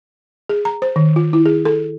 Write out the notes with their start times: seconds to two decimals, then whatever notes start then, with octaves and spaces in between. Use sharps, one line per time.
0.49 G#4
0.65 A#5
0.82 C5
0.96 D#3
1.16 F4
1.33 E4
1.46 G#4
1.65 A4